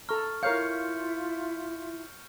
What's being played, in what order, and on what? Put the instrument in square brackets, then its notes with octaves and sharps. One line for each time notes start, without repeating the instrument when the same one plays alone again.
[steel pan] A4 A#5 [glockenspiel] C#6 F6
[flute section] E4 F4 E5 [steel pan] A#4 C#5 F5 [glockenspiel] G6 C#7